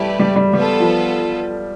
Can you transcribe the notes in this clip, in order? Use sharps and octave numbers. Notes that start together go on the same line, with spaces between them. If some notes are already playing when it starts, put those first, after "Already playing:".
Already playing: G3 A3 E4 G4 B4 D5
G3
G3
G3 B3 F4 A4
F3